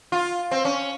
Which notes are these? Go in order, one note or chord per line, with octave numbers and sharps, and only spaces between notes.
F4
C4
C#4